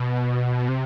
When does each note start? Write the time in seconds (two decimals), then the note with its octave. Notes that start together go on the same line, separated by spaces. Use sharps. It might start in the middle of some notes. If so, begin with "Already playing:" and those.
Already playing: B2
0.69 C3